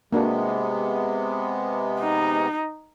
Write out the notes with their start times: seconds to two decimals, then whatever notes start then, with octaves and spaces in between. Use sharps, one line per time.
0.13 C3 G#3 A#3 B3 D4 F#4
2.00 D#4